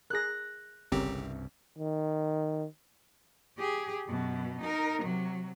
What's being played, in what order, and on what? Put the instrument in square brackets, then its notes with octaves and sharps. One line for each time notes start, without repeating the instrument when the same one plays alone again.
[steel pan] G#4 A#4 [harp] F#6 A#6
[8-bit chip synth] G1 C4 G4 [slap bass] C2 G2 [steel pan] C#3 C#4 A#4
[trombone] D#3
[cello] G4 G#4
F#2 B2
D#4 A#4
C3 F#3